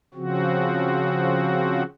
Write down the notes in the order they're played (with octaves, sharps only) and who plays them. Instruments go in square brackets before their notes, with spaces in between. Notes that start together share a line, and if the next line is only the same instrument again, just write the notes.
[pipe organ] C#3 F3 C4 F#4